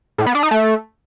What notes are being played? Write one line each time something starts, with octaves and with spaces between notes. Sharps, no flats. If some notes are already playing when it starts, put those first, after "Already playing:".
A2
B3
D4
D#4
A3